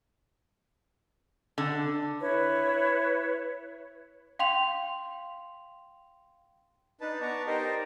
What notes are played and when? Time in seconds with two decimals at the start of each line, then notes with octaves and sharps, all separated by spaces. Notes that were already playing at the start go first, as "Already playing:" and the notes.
1.58 D3
2.20 E4 B4 C#5
4.39 F5 G5 C6 F7
7.01 D4 D#4 B4 A5
7.21 B3 D5 A5 A#5 C#6
7.46 D#4 G4 A#4 C5 D5 D#5